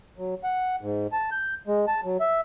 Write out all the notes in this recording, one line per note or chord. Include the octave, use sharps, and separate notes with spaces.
F#3
F#5
G#2
A5
G6
G#3
A5
F#3
E5